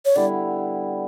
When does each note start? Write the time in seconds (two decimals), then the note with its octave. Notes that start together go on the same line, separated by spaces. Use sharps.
0.05 C#5
0.16 D3 G3 B3 E4 D5